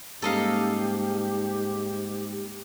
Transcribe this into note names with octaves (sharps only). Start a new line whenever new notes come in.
G#2 G3 A#3 C#4 G4 A4 D#5 F5